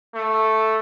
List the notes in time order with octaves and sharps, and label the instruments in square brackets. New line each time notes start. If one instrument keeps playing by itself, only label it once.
[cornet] A3